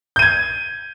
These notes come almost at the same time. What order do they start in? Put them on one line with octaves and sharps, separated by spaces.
G6 D#7 G#6